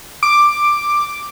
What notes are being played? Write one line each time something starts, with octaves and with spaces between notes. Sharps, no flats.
D6